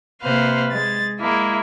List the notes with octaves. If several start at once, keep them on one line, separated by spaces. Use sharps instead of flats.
C3 A#3 B4 C5 F5
G#3 A6
G#3 A#3 E4